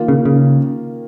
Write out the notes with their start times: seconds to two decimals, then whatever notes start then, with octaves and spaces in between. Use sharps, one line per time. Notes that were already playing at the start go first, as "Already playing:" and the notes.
Already playing: D#3 A#3 F4
0.08 C#3
0.25 C#3